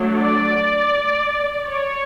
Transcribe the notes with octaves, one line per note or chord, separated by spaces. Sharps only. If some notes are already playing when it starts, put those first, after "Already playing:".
Already playing: F#3 A3 D4
D5
C#5